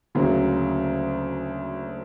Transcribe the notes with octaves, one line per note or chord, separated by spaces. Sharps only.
D2 C#3 F#3 A#3